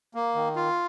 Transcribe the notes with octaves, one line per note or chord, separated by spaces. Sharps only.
A#3
D#3
F4